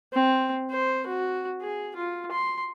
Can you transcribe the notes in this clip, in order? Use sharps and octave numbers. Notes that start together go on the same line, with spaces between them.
C4
C5
F#4
G#4
F4
C6